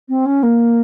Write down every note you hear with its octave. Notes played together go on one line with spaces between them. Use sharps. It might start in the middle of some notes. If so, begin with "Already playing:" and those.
C4
C#4
A#3